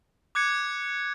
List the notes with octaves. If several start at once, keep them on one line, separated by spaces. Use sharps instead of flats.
D6 F#6 G#6 C#7